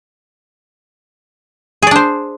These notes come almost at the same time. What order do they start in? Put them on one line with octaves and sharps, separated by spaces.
G#4 D5 D4 C5